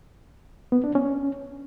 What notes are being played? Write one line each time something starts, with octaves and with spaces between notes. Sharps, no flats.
B3
D4
C#4